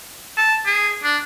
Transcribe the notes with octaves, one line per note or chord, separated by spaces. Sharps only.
A5
G#4
D4